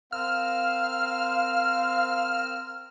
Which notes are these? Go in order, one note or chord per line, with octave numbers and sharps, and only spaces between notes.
C4 A#4 F5 E6 F6